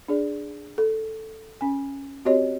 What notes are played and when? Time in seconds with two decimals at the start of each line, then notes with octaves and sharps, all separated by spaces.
0.08 D4 G#4 D5
0.78 A4
1.61 C#4 G#5
2.25 C4 F#4 G4 C#5 D#5